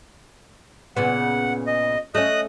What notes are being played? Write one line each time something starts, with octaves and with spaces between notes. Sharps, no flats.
A#2 C#3 B3 F#5
D#5
A3 C#4 D#5 D#6 F#6